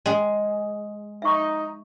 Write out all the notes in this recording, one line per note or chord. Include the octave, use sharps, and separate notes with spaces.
G#3 G#4
D#4 E5 C#6